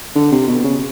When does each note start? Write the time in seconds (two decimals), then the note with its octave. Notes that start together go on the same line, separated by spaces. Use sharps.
0.15 D3
0.32 C3
0.47 B2
0.64 C#3